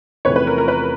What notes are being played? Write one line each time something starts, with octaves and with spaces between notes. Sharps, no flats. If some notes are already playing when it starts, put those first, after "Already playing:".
E2 C3 F3 A3 C#4 B4 C#5
B4
A#4
A#4
B4